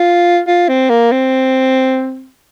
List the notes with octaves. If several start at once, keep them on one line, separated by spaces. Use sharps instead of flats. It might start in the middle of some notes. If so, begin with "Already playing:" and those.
Already playing: F4
F4
C4
A#3
C4